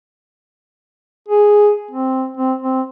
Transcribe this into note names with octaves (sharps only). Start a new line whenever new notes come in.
G#4
C4
C4
C4